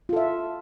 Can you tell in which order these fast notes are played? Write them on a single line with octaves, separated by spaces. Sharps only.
F4 A4 E5